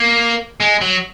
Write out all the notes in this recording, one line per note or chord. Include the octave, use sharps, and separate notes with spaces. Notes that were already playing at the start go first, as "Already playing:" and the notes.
Already playing: A#3
G#3
F#3